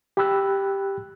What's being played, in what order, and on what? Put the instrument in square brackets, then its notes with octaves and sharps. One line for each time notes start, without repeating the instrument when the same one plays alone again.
[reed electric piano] G4 G5 B5 E6 F#6